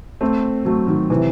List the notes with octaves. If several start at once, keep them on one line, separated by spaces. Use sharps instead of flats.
A3 C4
F#3 A3
D#3 F#3
C3 E3